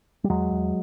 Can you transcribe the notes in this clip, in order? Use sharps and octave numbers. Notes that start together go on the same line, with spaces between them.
G3
E2 F#3 G#3
E2